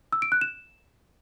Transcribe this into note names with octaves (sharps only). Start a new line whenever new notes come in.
E6
D7
F#6
E7